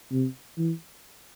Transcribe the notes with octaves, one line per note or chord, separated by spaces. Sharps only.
C3
E3